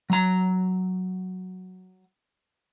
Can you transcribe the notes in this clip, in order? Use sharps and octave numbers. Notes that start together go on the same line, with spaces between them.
F#3 A#5